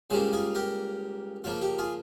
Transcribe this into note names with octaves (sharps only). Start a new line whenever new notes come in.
C#2 C#3 G3 A#3 C#4 G#4 C5
F4 G#4
G4 A#4
C#3 F3 A#3 F4
G4
F4 G#4